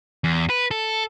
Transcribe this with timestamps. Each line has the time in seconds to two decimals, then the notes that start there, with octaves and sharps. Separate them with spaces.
0.24 E2
0.50 B4
0.71 A4